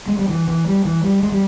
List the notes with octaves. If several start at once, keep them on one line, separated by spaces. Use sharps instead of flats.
G#3
G3
E3
E3
G3
E3
G3
G#3
G3